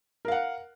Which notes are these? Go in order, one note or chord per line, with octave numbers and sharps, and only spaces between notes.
A#4 F5 F#5